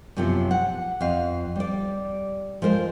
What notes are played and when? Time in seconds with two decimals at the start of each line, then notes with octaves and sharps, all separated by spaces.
0.17 F#2 C3 F3 B3 F4
0.51 F#5
1.01 F2 F5
1.56 G3 D5
2.62 F3 G#3 A#4 C5